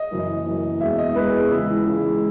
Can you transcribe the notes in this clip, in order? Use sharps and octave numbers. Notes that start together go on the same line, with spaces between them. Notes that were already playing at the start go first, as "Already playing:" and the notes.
Already playing: D#5
F#1 F#2 E3
F#1 F#2 E3
E1 E2 B2 G#3 E5
D#5
E1 E2 B2 G#3 B4
G#4
C#2 C#3 E3 G#3 E4
C#2 C#3 E3 G#3